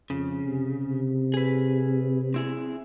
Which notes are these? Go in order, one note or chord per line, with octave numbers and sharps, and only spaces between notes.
F2 C#3
C3
C3
G#4 B4
C4 E4 G#4